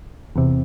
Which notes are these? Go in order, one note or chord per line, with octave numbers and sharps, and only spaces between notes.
E2 C3